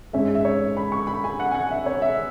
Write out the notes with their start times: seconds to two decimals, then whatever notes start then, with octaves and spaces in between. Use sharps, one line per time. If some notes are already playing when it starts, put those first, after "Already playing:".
0.13 G#2 G#3 C#4 E5
0.35 E5
0.45 C#5
0.77 B5
0.92 C#6
1.07 B5
1.24 G#5
1.40 F#5
1.51 G#5
1.54 F#5
1.71 E5
1.86 C#5
2.02 E5